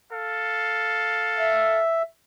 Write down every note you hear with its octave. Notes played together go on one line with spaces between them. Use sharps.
A4 F5
E5